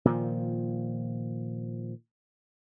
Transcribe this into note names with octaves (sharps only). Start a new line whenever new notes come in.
A#2 D#3 F3